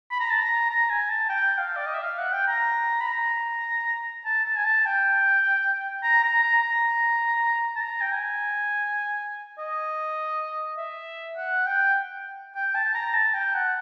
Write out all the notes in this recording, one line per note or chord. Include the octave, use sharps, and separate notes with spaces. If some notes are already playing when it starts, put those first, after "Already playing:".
B5
A#5
A5
A#5
A#5
G#5
A5
G5
F5
D5
D#5
E5
F5
F#5
G5
A#5
B5
A#5
A5
A5
G#5
A5
G5
A#5
A#5
A#5
A#5
A5
A#5
G5
G#5
D#5
E5
F#5
G5
G5
A5
A#5
A5
G5
F#5